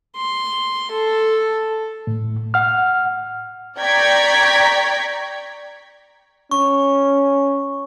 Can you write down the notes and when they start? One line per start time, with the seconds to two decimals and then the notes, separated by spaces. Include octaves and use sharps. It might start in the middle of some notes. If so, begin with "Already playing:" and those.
0.17 C6
0.91 A4
2.07 A2
2.54 F#5 F6
3.79 D5 G5 A#5 C#6 G#6 B6
6.51 C#4 C#6